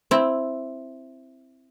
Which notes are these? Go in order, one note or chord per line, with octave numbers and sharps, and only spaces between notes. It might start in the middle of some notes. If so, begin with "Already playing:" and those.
C4 E4